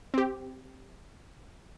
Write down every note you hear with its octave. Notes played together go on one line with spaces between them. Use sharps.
C4 G4